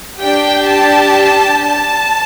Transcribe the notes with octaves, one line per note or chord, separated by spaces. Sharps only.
D4 G4 G5
A5
A5